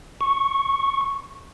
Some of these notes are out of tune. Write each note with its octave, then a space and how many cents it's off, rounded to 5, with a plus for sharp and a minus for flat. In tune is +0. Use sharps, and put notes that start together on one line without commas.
C#6 -5